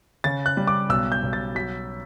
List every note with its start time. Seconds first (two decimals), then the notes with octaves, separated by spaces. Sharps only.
0.24 C#3 A6
0.46 F#6
0.57 G3
0.67 D6
0.89 B1 E6
1.12 G6
1.23 B1
1.33 A6
1.55 F#3 B6